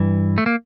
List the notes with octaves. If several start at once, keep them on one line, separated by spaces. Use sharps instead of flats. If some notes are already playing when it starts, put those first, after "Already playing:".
Already playing: G2 E3
A3
A#3